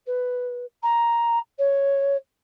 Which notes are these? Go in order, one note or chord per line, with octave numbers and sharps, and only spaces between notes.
B4
A#5
C#5